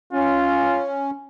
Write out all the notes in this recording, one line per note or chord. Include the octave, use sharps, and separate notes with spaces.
C#4 F4